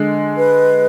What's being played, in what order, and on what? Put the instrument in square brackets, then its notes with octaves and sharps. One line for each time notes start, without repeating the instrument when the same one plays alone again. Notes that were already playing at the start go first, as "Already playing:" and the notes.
Already playing: [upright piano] D3 G#3
[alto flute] B4